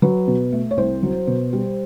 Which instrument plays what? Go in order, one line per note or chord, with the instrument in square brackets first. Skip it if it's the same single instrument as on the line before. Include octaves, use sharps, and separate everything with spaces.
[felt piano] F#3 B4
B2
A3
C#5
C2 C5
F#3
B2
G3